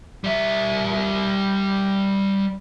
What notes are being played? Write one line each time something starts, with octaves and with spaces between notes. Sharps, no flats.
G3 E5